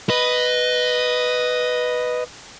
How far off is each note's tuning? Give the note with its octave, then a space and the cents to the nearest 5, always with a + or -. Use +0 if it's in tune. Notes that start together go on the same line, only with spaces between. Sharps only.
B4 +0 D#5 +0